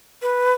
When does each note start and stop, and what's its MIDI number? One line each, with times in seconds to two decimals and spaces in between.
0.22 0.53 71